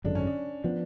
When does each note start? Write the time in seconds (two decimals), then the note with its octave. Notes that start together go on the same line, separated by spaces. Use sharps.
0.04 G#1 F#2 D3 G#3 D4
0.15 C#4
0.27 D4
0.64 F3 B3 D4